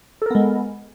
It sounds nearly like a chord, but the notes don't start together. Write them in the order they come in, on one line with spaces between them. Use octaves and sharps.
A4 A#4 B3 G#3